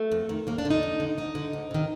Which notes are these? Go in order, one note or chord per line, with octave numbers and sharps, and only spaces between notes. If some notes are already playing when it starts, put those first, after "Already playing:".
Already playing: A3
F2
D#3
D#2 A#3
D4
D3
D#4
F2
D3
D2 D#4
D3
D2
C3 D#3